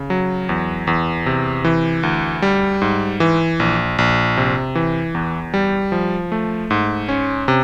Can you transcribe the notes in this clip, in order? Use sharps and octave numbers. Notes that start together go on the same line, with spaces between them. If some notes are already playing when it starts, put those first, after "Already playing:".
Already playing: C#3
F#3
E2
E2
C3
E3
D2
G3
G#2
E3
A#1
A#1
C3
E3
E2
G3
F3
A3
G#2
C#4
C3